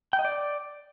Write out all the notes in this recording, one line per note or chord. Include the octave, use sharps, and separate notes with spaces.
G5
D#5
D5